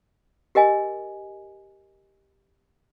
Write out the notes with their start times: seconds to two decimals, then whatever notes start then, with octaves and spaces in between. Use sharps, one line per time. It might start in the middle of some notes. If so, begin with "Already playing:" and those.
0.55 G4 A#4 D#5 G#5